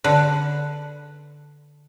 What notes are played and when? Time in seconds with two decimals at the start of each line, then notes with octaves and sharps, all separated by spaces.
0.04 D3 B4